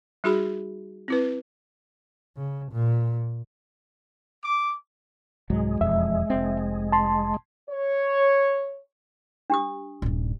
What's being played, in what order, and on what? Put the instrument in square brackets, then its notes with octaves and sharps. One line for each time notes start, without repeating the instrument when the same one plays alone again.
[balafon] G3 D#4 F#4 G#4 B5
C4 E4 B4
[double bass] C#3
A#2
[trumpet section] D6
[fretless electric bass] C2 G#2 F#3 [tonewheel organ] G#3
[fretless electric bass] E1 F2 [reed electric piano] E5
[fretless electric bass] F1 C4
[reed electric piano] A5 C6
[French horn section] C#5
[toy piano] D4 G4 D#6
[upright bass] D#1 G2